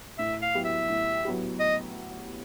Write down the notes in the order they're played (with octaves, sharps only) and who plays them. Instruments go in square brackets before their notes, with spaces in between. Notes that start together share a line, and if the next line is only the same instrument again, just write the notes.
[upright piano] A2 [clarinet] E5
[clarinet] F5
[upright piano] F#3 B3 E4 G4
[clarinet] E5
[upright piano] A2
F#3 B3 E4 G4
[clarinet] D#5